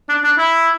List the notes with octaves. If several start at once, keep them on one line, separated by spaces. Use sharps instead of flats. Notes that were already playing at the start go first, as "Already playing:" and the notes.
D4
D4
E4